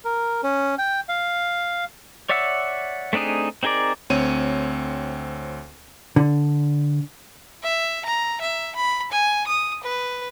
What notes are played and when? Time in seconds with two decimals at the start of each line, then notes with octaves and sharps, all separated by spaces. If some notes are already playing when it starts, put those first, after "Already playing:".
0.05 A#4
0.43 C#4
0.78 G5
1.09 F5
2.29 C#5 D5 E5 F#5 E6
3.13 A3 C4 D4 D#4 G#4
3.63 C4 D#4 G#4 A#4 D5
4.10 D2 C4 C#5 D#7
6.16 D3
7.63 E5
8.06 A#5
8.41 E5
8.76 B5
9.12 G#5
9.47 D#6
9.84 B4